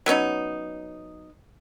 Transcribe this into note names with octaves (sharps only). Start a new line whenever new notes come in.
F#3 B3 C#4 D#4